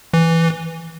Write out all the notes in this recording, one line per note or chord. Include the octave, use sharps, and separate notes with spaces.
E3